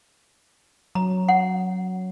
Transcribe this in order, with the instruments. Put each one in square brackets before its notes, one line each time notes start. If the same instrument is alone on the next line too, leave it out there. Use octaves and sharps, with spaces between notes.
[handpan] F#3 [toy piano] A#5
[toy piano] F#5